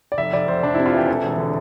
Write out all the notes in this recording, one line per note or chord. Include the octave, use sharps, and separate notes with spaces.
D5
F1 E5
F1 D5
F1 C5
F1 D4
C3 E4
F4
E3 G4
E1 A4
E1
D3